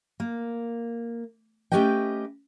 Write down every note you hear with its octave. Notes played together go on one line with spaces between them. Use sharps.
A#3
A3 C#4 G4 B4 D#5 G5